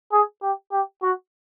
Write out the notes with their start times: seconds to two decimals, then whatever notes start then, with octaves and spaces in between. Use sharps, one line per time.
0.13 G#4
0.43 G4
0.72 G4
1.03 F#4